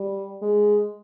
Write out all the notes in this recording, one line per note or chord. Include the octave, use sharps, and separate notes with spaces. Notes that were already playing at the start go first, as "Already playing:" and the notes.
Already playing: G3
G#3